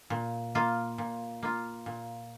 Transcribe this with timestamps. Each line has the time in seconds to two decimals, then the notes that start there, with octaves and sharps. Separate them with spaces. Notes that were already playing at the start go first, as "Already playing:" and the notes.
0.10 A#2
0.55 A#3 F4
0.98 A#2
1.43 A#3 F4
1.86 A#2